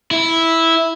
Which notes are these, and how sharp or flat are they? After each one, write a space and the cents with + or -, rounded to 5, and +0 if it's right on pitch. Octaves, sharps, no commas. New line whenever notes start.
E4 -5